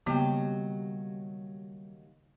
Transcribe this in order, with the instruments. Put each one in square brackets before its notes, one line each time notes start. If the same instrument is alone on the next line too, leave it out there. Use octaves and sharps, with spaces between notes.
[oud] D#2 F#3 G4 [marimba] C#3 B3 [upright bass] G3